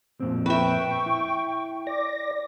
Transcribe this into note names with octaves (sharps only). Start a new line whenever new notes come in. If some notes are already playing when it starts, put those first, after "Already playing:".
F2 A#2 C4
B4 E5 G5 C#6
E4
D5 D6 A#6